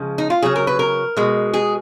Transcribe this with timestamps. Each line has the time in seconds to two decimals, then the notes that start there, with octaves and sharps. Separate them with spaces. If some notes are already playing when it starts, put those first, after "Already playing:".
Already playing: C#3 F3 G#3
0.18 D#4
0.30 F4
0.42 C#3 F#3 G#4
0.56 A#4
0.67 B4
0.79 A#4
1.17 B2 G#3
1.54 G#4